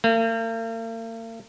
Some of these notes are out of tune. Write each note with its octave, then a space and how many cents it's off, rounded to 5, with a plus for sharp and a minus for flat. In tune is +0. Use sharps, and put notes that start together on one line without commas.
A#3 -45